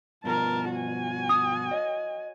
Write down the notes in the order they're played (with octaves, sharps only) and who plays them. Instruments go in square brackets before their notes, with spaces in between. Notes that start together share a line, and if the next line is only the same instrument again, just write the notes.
[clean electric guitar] G2 B2 F3 [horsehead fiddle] A#4 A5
[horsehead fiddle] F#4 G#5
[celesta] D#6
[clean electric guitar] C#5 D#5